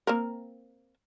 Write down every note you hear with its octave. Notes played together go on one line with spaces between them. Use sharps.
A#3 C4 A#4